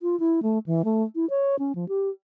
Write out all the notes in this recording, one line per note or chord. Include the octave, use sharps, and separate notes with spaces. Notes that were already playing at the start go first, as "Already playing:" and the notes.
F4
E4
A3
E3
A3
E4
C#5
C#4
F3
G4